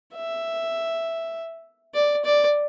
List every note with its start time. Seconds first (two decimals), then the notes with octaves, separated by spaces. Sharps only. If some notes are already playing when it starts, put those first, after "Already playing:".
0.15 E5
1.94 D5
2.25 D5